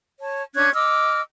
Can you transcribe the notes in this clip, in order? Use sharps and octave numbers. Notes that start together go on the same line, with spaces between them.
C#5 A5
C#4 D4 F#6 G#6
D#5 D6 E6 F6